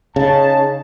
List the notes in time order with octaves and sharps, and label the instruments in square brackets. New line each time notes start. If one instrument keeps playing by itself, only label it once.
[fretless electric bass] C#3 [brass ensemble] C#4 D#4 A5